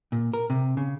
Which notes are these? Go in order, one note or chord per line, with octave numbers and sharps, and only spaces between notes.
A#2
A#4
C3
C#3